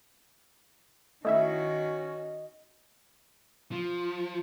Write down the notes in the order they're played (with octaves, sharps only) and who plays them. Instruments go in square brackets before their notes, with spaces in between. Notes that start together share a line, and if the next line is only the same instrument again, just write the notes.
[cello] D#3 F#4 [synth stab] A3 E4 E5 [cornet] C#4 [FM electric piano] D#5
[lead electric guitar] F3